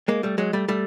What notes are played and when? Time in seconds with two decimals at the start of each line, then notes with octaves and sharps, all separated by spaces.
0.08 G#3 A#3
0.23 G3 A3
0.38 F#3 G#3
0.53 G3 A3
0.68 G3 A3